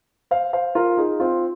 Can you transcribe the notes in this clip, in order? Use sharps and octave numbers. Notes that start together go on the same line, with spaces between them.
C5 F5
C5 F5
F4 A#4
D#4 G#4
C4 F4